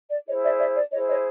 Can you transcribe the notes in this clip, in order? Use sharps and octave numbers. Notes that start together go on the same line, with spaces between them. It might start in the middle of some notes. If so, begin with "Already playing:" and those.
D5
E4 G#4 C5 C#5 D#5
D5 E5
D5 E5
D5
E4 G#4 C5 C#5 D#5
C#5 D#5